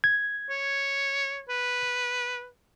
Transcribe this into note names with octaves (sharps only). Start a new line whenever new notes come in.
G#6
C#5
B4